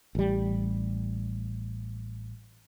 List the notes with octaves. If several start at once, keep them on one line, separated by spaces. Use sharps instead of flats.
A1 G3